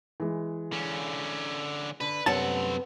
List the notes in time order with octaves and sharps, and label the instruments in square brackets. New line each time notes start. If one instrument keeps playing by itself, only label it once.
[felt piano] E3 G#3
[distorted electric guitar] D3 C#4
[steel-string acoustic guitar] D3 [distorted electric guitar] B4
[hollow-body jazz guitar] C2 F#2 A5 [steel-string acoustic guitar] B3 A4 [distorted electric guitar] C4 F#5